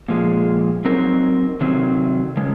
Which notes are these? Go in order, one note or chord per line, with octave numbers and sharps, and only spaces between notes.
A#2 F3 G#3
F#3 C4 D#4 A#4
C3 D#3 F#3 C4
C#3 G#3